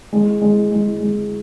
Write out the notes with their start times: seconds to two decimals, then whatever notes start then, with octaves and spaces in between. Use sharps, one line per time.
0.13 G#3
0.41 G#3
0.72 G#3
1.00 G#3